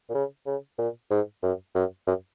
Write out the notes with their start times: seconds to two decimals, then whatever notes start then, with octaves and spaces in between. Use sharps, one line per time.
0.09 A#2
0.14 C#3
0.46 C#3
0.78 A#2
1.11 G#2
1.43 F#2
1.75 F#2
2.07 F#2